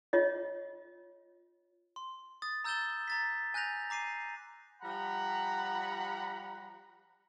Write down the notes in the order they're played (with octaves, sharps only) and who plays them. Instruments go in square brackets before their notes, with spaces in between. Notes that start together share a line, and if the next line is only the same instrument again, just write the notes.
[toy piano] F4 C#5 D#5
[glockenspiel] C6
D#6 A6
A#5 E6 G6 A6 E7 G7
A#5 A6 B6
G#5 F#6 G6 A#6 F7
A#5 D6 C7 D#7
[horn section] F3 G3 F#5 A#5 B5